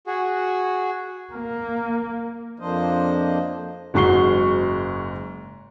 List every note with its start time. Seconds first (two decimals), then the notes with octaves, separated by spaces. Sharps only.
0.07 F#4 G#4
1.33 A#3
2.60 F2 F3 A#3 D4 C5 D#5
3.94 F#1 G#2 F#4 C#6 C7 G7